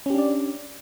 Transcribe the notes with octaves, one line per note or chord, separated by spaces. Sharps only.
C#4 D4 G4 D5